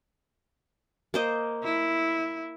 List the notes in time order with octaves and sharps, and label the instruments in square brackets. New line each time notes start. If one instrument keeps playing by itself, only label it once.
[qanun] A#3 C5 D#5
[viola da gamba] E4